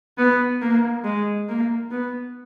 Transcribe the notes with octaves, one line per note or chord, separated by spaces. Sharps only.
B3
A#3
G#3
A#3
B3